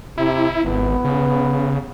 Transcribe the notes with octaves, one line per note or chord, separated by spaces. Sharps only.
C3 E4
G#1 B3
C#3